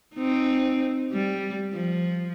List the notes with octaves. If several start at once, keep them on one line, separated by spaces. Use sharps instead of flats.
C4 D#4
G3
F3